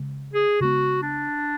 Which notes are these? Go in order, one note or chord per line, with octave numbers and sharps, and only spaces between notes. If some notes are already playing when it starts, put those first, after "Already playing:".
Already playing: C#3 G#3
G#4
C#3 G#3 B3 F#4
D4